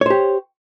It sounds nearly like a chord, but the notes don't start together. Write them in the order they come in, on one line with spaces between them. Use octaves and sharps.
C#5 C5 G4